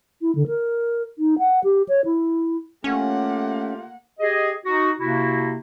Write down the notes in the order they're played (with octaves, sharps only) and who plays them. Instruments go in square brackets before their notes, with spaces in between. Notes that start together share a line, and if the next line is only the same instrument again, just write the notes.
[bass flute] E4
D3
A#4
D#4
F#5
G4
C#5
E4
[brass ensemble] A3 F4 G4 [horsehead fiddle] A#3 F#5 [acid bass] C#4
[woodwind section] G4 G#4 D#5
D#4 F#4
C3 A#3 E4 F#4